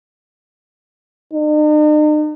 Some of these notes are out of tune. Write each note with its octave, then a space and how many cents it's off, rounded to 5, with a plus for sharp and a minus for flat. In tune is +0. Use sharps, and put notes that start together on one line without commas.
D#4 -45